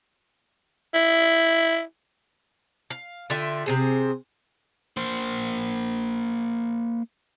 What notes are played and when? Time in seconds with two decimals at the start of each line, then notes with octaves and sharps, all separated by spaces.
0.94 E4
2.90 F5
3.30 D3 F4 E5 G5
3.66 C3 C4 G#4
4.97 A#3 C5